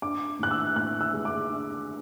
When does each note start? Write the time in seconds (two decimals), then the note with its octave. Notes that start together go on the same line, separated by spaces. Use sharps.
0.02 D4 D6
0.39 A2 F#6
0.51 E6
0.76 A2 F#6
1.01 E6
1.14 G#3
1.25 D6
1.50 D4